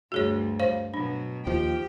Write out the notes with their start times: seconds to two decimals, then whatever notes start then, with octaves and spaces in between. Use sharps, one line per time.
0.12 D2 G2 F#4 G#4 C#5
0.60 C5 C#5 F5
0.94 B2 F#3 D4
1.47 D#2 F3 G4 G5